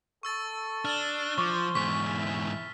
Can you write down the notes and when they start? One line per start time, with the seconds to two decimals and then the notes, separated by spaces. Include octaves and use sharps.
0.23 A4 C#6 E6 A6
0.85 D4 F6 G7
1.38 F3 C5 C#6 D6
1.75 E2 G#2 C#6 B6
2.07 E4